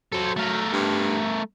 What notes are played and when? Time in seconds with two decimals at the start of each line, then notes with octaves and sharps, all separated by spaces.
0.12 F#3 A4 C5
0.37 A3 A#4
0.72 G2